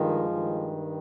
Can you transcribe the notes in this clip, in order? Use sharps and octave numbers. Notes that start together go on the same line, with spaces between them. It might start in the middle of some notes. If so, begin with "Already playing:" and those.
Already playing: G2 D#3 F3 G#3
G2 D#3